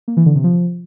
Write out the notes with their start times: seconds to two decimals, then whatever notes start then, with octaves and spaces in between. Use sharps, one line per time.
0.08 A#3
0.17 E3
0.26 D3
0.35 C3
0.44 F3